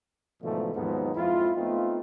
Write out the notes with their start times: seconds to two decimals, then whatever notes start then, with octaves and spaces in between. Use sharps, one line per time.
0.43 G#2 B2 D3 E3 F3 A3
0.74 D#2 G#2 F3 F#3 B3 D#4
1.15 F2 G#3 E4 F4
1.56 A3 B3 C4 D#4 F4